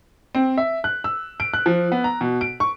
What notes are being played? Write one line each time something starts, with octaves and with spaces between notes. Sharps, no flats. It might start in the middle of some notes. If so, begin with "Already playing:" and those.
C4
E5
F#6
E6
D7
F#6
F3
B3
A#5
B2
D7
C#6